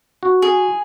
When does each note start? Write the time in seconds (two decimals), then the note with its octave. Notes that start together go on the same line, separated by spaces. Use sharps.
0.23 F#4
0.42 G#4